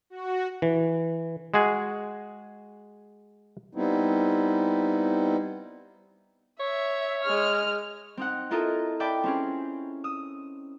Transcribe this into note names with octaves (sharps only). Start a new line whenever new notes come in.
F#4
E3
G#3 F#4 G#4
G3 B3 C4 D#4 E4
C#5 E5
G#3 F6
C4 D#4 F#5
E4 F4 A4 A#4 D#5 E5
D5 E5 G5 A5 B5
C4 C#4 G#4
D#6 E6